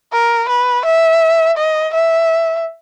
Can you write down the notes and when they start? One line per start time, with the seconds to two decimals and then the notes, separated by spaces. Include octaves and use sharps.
0.12 A#4
0.49 B4
0.85 E5
1.57 D#5
1.94 E5